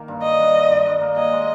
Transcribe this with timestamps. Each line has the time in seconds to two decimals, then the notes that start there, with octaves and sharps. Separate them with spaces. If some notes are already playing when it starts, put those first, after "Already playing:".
Already playing: D#3 A#3
0.08 G2
0.23 G2 D#5
0.39 G2
0.55 G2
0.70 G2
0.86 G2
1.01 A#3
1.16 G#4 D#5
1.32 G#3